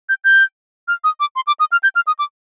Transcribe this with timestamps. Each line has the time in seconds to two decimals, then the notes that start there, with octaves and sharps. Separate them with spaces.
0.09 G6
0.24 G6
0.88 F6
1.04 D#6
1.20 D6
1.36 C6
1.47 D6
1.60 D#6
1.72 F6
1.83 G6
1.95 F6
2.07 D#6
2.19 D6